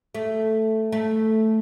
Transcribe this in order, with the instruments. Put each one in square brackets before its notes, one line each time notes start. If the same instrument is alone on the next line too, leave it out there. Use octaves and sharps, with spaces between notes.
[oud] A3
A3